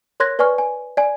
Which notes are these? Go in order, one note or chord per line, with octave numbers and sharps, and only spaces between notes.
A#4 C#5 C6 F#6 G#6 A#6
B4 D5 G#5 C#6 F6
G#5
D5 G#5